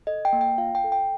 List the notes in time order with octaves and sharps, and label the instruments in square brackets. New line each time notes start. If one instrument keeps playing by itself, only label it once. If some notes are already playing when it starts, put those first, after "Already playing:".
[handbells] A4 D#5
G5
A#3
G5
F4 F5
G5
A4
G5